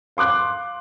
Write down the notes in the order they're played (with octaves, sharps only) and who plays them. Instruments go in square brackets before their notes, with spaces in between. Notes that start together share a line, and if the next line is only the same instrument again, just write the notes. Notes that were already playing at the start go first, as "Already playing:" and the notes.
[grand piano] F5 C6 D6 F#6